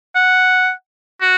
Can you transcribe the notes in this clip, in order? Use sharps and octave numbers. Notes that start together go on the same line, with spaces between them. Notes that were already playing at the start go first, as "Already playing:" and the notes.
F#5
F#4